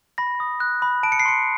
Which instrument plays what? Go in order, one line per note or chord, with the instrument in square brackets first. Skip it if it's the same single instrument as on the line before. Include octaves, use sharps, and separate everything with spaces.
[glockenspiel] B5 A#6
D#6
F#6
B5
A5 D7
C#7
C7
C6 C#7